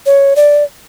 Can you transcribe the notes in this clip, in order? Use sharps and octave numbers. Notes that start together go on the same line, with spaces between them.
C#5
D5